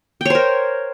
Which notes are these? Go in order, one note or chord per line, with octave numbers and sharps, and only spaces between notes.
A#4 C5 C#5 G5